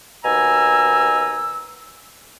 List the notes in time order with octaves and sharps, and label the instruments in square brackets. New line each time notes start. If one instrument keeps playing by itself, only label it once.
[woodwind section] D#2 B2 G#5 A#5 E6